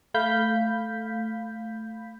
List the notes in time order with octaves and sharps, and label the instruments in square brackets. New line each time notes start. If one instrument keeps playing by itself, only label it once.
[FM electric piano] A3 F5 B5 G6 B6